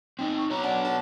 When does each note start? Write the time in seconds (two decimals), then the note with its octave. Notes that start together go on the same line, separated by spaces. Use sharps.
0.19 C4 D#4 G5
0.38 C#6
0.50 B3 F#4 C#5 A#5
0.63 D4 F#5
0.85 A5